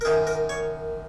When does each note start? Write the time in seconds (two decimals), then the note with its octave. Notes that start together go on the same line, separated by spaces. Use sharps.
0.01 A#4
0.05 F#2 D#3 G#4
0.27 A#4
0.49 C#5